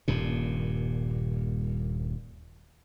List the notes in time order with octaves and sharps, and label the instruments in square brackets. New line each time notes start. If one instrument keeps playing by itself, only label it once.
[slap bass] D#1 G2 A#2